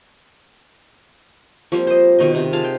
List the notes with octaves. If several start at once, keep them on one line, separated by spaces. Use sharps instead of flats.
F3 G3 A#3 C4
C5 D#5
B2 D#3 D#4 D#5
C3
F4 G#4 F5 A5
G5